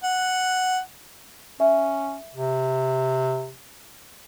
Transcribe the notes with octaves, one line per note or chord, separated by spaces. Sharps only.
F#5
C#4 E5
C3